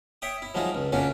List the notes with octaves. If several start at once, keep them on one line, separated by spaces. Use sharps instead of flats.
C#5 E5 G5 D#6
E4
F3 F#3 G#3 D#4 F4
C#2
A2 C#3 C#4 D4 F4 F#4